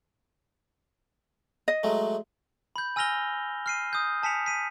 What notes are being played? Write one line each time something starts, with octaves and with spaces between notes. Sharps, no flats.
D#5
F#3 G#3 A3
B5 G6
G#5 E6 F6 A#6 F7 G7
F6 C7 D#7
D#6 G6
G#5 A5 B6 C#7 F7
B6 D#7